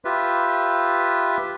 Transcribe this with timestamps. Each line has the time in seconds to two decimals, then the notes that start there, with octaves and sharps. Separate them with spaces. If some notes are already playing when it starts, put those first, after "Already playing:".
0.05 F4 G4 B4 E5